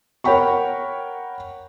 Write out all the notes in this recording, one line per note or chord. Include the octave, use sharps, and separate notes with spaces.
A#4 C#5 F#5 G5 B5 C#6